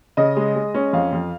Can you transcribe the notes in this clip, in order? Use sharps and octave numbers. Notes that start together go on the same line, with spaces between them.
C#3 D#5
G#3
G#3
C#4
F2 F5
F2